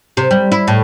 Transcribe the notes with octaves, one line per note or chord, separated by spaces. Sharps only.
C3
G3
E4
A2